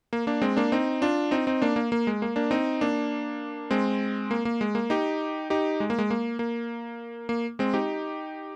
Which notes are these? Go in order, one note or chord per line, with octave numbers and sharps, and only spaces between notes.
A#3
A#3 D4
G#3 C4
A#3 D4
C4 D#4
D4 F4
C4 D#4
C4 D#4
A#3 D4
A#3
A#3
G#3
A#3
A#3 D4
C4 D#4
A#3 D4
G#3 C4
A#3
A#3
G#3
A#3
D#4 G4
D#4 G4
G#3
A#3
G#3
A#3
A#3
A#3
G#3 C4
D#4 G4